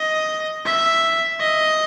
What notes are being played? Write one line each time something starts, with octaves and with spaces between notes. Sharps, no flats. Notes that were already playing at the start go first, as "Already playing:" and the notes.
Already playing: D#5
E5
D#5